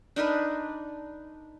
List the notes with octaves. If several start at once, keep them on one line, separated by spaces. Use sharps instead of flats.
D4 D#4 A#4 B4